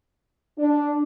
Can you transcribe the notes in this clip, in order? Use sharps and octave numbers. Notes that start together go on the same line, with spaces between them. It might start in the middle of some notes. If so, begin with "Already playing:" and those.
D4